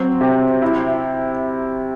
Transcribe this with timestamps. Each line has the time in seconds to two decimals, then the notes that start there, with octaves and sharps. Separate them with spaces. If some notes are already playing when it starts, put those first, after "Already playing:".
Already playing: F#3 C4
0.21 C3
0.62 E4